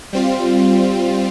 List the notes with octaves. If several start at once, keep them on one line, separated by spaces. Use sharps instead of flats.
G3 C4 F4